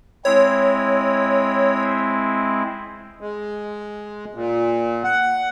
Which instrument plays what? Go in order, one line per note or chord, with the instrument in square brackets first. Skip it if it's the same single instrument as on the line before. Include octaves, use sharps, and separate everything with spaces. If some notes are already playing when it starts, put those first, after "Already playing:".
[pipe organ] G#3 C4 E4 [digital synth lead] C#5
[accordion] G#3
A#2
F#5